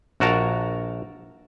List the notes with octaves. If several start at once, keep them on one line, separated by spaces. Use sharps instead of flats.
A#1 F#4 A#4 A5 A#5